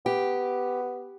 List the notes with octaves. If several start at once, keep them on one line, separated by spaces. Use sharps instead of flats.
B3 G4